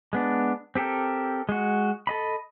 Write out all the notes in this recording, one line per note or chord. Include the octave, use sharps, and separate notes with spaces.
G#3 B3 D4
C4 G4 A4 A#4
G#3 F#4
A4 D#5 B5